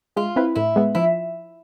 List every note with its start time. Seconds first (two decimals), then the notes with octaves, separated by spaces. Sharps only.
0.16 G#3 F4
0.36 C4 E4 B4
0.55 A2 E4
0.76 G#3 B3
0.95 F3 E4